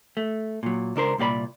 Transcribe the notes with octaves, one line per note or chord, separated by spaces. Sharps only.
A3
A#2 F#3
C#2 D4 A#4 C5
C2 A#2 G4 D5 B5